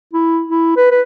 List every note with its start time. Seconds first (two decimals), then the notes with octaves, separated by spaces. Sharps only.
0.13 E4
0.48 E4
0.77 B4
0.91 B4